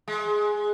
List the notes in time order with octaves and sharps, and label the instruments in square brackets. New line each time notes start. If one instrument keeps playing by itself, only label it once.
[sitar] G#3